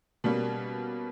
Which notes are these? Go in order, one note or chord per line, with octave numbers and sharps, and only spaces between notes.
B2 G3 A#3 C#4